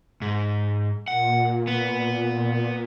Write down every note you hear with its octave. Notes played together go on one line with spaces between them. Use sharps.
G#2
A#2 F#5
B3